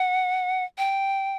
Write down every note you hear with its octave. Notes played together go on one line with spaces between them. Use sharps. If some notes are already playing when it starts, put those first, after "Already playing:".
Already playing: F#5
G5